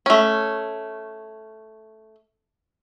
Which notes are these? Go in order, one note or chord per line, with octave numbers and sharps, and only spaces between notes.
A3 C#4